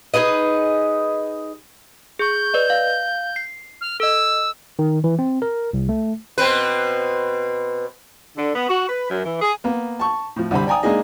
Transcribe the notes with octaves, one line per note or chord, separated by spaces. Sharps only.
D#4 G#4 B4 D#5
G#4 C#6 G6
B4 D5 D#5
F5
C7
F6
A4 D#5 E6
D#3
E3
C4
A#4
C2
A3
B2 C4 B4
D3
B3
F#4
B4
F#2
E3
G#4
A#3 B3
A5 C#6
A2 F3
C2 D3 G3 C5 B5
D5 G5 G#5 A#5 D#6
G#3 A#3 D4 D#4 G#4 D#5